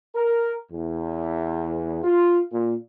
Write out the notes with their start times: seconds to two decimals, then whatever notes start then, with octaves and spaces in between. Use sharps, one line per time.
0.15 A#4
0.72 E2
2.04 F4
2.51 A#2